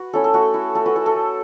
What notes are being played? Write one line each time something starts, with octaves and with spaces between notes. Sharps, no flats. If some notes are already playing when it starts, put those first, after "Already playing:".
Already playing: F#4 B4
A3 C#4 E4 A4
A4
A3 F#4
E4
A3 A4
F#4 B4
E4 A4
A4
A3